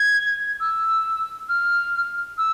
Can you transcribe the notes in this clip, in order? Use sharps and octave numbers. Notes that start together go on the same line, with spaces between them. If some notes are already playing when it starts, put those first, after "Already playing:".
Already playing: G#6
E6
F6
E6